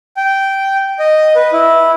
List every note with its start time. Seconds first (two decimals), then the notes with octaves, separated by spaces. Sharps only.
0.17 G5
0.99 D#5
1.36 B4
1.53 E4